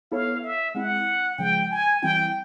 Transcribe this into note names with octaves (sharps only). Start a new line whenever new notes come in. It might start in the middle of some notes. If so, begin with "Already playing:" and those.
B3 E4 A4 C#5 F5
E5
G#3 C4 E4 F#5
C#3 F3 G#3 G5
G#5
E3 G3 C4 E4 G5